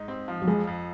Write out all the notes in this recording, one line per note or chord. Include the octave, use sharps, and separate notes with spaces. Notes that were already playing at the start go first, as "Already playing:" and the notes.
Already playing: G#2 D#4
C4
F3
F#3
F2 G#3
F2